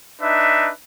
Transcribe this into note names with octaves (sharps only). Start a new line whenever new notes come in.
D4 D#4 B4 E5